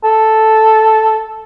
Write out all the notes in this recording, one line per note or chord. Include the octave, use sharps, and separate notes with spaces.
A4